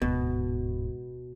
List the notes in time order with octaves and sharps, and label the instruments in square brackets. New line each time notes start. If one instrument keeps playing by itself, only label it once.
[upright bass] D1 G#2 [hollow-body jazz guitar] B2